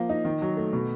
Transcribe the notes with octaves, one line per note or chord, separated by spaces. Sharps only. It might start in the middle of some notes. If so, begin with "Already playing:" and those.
Already playing: F3 A#3
D#4
D#3
F#3
A3
B2